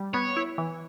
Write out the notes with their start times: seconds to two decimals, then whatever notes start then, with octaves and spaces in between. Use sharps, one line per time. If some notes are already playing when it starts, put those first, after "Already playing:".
Already playing: G3
0.14 B3 C#5
0.37 E4
0.58 E3